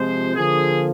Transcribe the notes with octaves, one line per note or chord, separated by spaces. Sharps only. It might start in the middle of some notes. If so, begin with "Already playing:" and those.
Already playing: C3 F3 G#3 C5
D3 F3 A#3 G#4